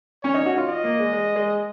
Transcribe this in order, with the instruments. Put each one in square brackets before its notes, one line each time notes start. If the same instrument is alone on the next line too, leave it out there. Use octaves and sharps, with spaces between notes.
[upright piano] C#4 [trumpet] C#5
[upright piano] D#4
F#4
F4
[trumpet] D#5
[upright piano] A#3
G#3
G#3
G#3